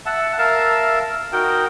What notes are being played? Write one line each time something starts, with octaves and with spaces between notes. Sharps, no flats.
E5 F#5 A5
A#4 E5 F5 A5
D#4 F#4 A#4 G5